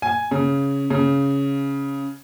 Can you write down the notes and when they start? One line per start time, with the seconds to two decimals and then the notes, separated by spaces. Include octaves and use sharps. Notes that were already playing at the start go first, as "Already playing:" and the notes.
0.02 G#5
0.31 C#3
0.90 C#3